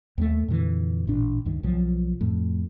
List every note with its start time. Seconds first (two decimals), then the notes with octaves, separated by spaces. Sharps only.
0.18 D#2 G#3 A3
0.48 F2 A#2 D3 E3
1.07 A1 A#2 D4
1.45 C#2 G2 D#3
1.63 B1 F3 F#3
2.21 F2 A2